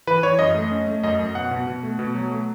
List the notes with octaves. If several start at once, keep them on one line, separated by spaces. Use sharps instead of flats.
E3 B4
E3 C#5
F#2 D#5
A3
C#4
A3
F#2 D#5
F#2
B2 F#5
B2
B2
A3
B2
F#3
A3